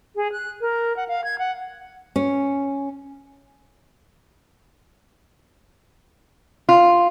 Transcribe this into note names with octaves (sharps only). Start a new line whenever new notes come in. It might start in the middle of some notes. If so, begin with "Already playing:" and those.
G#4
F#6
A#4
F#5
F5
G#6
F#5
C#4
F4